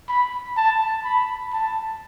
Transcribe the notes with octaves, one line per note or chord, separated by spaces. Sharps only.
B5
A5
B5
A5